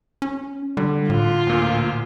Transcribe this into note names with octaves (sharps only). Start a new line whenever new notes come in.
C#4
D3 G3
A2 F4
D2 A#2